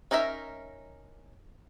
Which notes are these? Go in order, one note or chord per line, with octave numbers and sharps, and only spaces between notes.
C#4 D#4 A#4 B4 E5